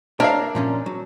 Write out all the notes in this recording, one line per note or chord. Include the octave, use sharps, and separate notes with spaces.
D4 A#4 C#5 E5 F5
A#2 F3 C#4
F#3